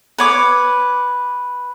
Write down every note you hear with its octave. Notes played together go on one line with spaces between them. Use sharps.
B4 C#5 D6